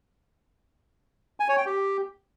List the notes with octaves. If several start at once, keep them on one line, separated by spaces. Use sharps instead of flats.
G#5
C#5
G5
G4